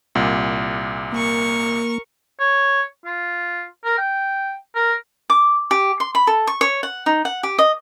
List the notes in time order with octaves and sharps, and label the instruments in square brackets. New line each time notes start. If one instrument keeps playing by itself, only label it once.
[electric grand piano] C2 A#2
[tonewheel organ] A#3 [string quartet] A#4 C#6
[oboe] C#5
F4
A#4
G5
A#4
[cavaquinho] D6
G4
C6
B5
A4
C#6
C#5
F#5
D#4
F#5
G4
D#5